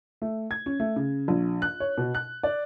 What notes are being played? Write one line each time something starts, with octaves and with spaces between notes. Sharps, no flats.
A3
G#6
C#4
A3
C#3
A#1
F#6
C#5
B2
F#6
D5